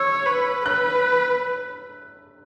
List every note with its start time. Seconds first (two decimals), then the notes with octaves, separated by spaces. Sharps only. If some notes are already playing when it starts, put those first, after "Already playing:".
Already playing: C#5 E6
0.26 B4
0.66 B4 F#6